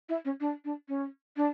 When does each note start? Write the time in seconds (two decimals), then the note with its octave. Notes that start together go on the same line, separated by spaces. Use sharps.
0.09 E4
0.25 C#4
0.40 D4
0.65 D4
0.88 C#4
1.37 D4